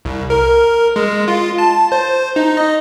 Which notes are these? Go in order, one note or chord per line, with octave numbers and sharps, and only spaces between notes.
C2
A#4
G#3
F4
A5
C5
D#4
D#5